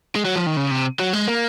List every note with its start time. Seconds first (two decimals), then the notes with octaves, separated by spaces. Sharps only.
0.16 G#3
0.25 F#3
0.36 F3
0.47 D#3
0.57 C#3
0.71 C3
1.00 F#3
1.13 G#3
1.28 A#3